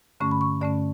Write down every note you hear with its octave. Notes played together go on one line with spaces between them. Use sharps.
G2 D3 A3 C#4 C#6
B5
C#6
G2 D3 A3 C#4 D5